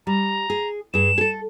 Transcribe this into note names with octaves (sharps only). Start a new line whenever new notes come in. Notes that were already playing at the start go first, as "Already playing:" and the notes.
G3 A#5
G#4
G2 G#4 E7
G#4 A4